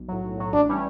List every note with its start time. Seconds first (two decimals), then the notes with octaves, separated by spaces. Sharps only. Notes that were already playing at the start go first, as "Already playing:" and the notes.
Already playing: B1
0.08 A2 F#3
0.23 B1
0.37 A2 F#3
0.53 A1 D4
0.69 E3 G3 C#4